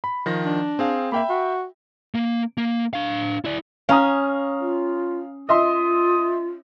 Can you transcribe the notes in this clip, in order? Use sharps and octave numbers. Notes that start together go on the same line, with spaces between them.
B5
D#3 F3 A#6
D4
C4 G#4 F5
A#3 E5 G5 B5
F#4
A#3
A#3
D4 F5
E4 D5
C#4 F5 A#5 D#6
F4
F4 D#5 E5 C6 D#6